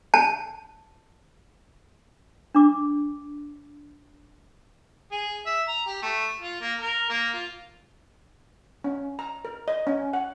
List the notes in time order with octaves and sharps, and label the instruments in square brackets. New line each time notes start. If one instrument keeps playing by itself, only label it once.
[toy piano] A5
D4 D6
[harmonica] G#4
E5
A#5
G4
A3
F4
A#3
A#4
A#3
F4
[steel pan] C#4
A#5
A#4
D#5
C#4
F#5